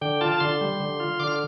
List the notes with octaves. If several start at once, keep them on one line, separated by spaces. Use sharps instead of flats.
D3 G5
F4 A5
A5
D3 C6
G3
D3
F4
D3 D6
F6